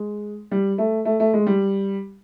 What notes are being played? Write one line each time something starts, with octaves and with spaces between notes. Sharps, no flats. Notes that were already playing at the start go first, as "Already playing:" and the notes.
Already playing: G#3
G3
A3
A3
A3
G#3
G3